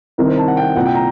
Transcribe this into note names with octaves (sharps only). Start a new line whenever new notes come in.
C2 C3 D#3 A#4
C5
A5
F#5
G5
F#5
C2 A#2 F#5
G5
A#5